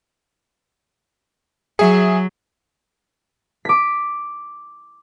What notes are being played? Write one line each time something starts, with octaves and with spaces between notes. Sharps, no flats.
F#3 G#4 E5
D6 B6